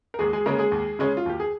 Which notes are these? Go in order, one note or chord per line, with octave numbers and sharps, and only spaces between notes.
A#4
D#2 G#3 G#4
G#3 G#4
C#3 G#3 A#3 C#4 A#4
G#3 G#4
D#2
C#3 G#3 C#4
F4
D#2 G4
G#4